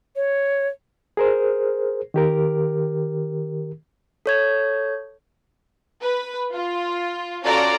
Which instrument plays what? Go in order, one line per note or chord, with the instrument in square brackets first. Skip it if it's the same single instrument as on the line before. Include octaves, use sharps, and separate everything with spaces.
[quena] C#5
[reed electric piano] G#4 A#4 C5
D#3 G4 A#4
[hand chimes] A4 C#5 G#6
[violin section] B4
F4
C#4 F4 F#4 A4 D5 A#5